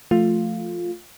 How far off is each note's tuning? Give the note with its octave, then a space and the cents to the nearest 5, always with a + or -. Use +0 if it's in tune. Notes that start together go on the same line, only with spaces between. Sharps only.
F3 -15 A3 +0 F4 +5